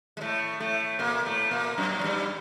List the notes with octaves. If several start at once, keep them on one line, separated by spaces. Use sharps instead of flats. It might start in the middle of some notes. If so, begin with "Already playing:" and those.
G#3
A2 A3
A2 A3
A#2 A#3
A2 A3
A#2 A#3
F#2 F#3
F#3
G2 G3